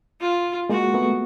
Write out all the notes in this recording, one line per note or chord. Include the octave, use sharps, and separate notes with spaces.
F4
G#3 A#3 F#4
A3 B3